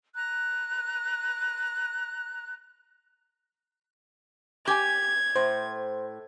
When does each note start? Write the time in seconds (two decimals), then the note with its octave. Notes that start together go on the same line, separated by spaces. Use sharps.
0.15 A#5 F#6
4.67 G4 G#5 G#6
5.36 A2 C5